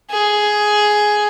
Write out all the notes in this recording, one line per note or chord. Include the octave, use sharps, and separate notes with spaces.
G#4